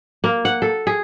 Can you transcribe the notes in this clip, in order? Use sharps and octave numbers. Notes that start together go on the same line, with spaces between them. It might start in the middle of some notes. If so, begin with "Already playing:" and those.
A#3
F#5
A4
G#4